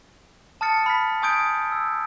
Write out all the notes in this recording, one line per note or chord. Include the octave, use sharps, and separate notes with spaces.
A5 D#6 F6 A6 C#7
B5 F6 B6
G#5 C#6 D#6 G6 G#6 D7
E6